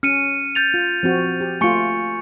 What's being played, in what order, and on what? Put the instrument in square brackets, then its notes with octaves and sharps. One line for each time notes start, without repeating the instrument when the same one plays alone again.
[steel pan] C#4 [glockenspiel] F6 C#7 D#7
[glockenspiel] G6 A6 F7
[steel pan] F4
F3 C4 F#4
G4
[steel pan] A3 F4 [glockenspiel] G#5 C#6 C#7